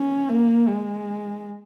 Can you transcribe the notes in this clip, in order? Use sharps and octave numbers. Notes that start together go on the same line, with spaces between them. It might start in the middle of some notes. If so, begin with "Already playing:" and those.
Already playing: C#4
A#3
G#3